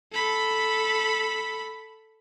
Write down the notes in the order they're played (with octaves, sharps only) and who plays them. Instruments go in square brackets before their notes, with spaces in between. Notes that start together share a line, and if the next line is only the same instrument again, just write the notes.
[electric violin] A4 B5